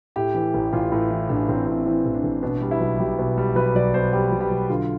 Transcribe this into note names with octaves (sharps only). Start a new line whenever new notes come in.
A2 G4
E3
A1
A1 F4
A2
E3
A1 D4
A1 C4
A2 C4
E3 C4
A1
D4
A1
B2 D4
G3
E4
B1
B1 G4
B2
G3
B1 B4
B1 D5
B2 C5
G3 G4
B1
G4
B1
D3 F4